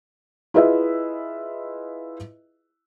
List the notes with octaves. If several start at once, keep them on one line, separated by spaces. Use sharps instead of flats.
E4 F4 G#4 B4 D#5 E5